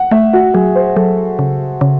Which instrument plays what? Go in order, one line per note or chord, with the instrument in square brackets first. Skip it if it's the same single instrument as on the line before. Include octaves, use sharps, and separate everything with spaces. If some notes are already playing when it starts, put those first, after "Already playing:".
Already playing: [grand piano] F#5
[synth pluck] A3 [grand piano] E5
[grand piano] F#4
[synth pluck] F#3 [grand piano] G#4
[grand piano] C5
[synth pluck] F#3 [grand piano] A4
[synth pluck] C#3
C#3